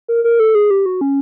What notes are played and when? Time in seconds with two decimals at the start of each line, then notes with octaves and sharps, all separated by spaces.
0.08 A#4
0.24 A#4
0.40 A4
0.55 G#4
0.70 G4
0.86 F#4
1.01 C#4